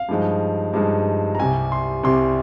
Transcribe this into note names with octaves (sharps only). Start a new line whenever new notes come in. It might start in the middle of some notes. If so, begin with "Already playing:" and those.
Already playing: F5
G2 F3 G#3 D#4
G2 F3 G#3 D#4
A#5
C2 C3 G3 G#5
C6
C2 C3 G3 C6